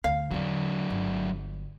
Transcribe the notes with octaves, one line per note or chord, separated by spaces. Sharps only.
D2 F5
E2 D3 F#3 D4
G1